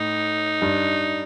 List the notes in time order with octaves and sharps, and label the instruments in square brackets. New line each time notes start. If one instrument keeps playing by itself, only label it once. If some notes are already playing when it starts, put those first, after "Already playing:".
Already playing: [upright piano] A2 [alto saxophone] D#4
[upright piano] G2